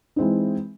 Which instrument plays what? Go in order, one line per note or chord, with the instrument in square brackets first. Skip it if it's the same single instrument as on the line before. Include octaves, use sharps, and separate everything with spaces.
[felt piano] E3 G#3 C4 D#4